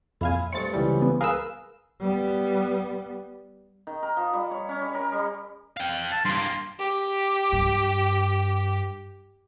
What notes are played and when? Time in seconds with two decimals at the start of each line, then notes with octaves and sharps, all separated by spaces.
0.21 F2 A#2 E4 F5 G#5
0.53 G2 A3 C4 A6 C#7
0.73 C#2 E3 G3
1.02 B3
1.21 G#4 A#4 B4 F5 E6
2.00 G3 B3
3.87 D#3
4.03 A#4
4.17 F3
4.34 G3
4.51 C#5
4.69 C#4
4.82 G3
4.95 A#4
5.12 G3
5.77 F5 G5
6.11 A5
6.25 G2 A#3 C6
6.78 G4
7.52 G2